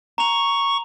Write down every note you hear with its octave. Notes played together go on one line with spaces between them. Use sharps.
A#5 C#6 F7